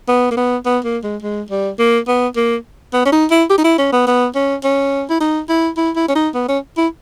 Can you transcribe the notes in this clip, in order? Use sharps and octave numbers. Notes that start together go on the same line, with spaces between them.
B3
A#3
B3
B3
A#3
G#3
G#3
G3
A#3
B3
A#3
B3
C#4
D#4
E4
G4
D#4
E4
C#4
B3
B3
C#4
C#4
E4
D#4
E4
E4
E4
C#4
D#4
B3
C#4
E4